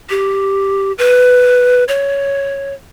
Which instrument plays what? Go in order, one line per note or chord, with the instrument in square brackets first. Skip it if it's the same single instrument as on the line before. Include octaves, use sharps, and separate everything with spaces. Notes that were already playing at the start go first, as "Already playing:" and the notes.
[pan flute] G4
B4
C#5